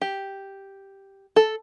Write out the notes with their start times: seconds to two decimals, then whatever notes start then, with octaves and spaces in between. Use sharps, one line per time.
0.01 G4
1.36 A4